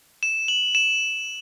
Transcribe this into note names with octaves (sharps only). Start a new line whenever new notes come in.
E7
F#7
E7